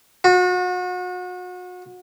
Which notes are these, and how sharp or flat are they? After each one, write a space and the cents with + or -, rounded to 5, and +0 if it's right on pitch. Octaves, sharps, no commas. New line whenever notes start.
F#4 -35